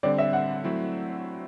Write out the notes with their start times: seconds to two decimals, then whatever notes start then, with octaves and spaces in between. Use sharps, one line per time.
0.03 D3 G3 C4 D5
0.18 E5
0.33 F#5
0.64 F#3 A3 C4 E4